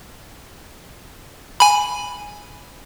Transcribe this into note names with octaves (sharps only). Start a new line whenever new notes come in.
G#5 B5